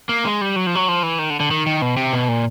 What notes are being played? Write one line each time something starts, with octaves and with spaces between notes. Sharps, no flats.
A#3
G#3
G3
F#3
F3
F#3
F3
E3
D#3
D3
D3
D#3
D#3
B2
C3
B2
A#2